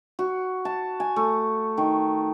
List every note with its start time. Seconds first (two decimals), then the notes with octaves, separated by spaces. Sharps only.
0.19 F#4
0.65 A5
1.00 G#5
1.16 A3
1.77 D#3